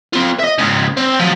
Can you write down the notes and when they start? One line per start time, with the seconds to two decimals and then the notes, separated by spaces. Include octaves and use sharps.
0.13 C4 F4
0.39 D#5 E5
0.58 G#2 C#3
0.97 C4
1.19 F3 F#3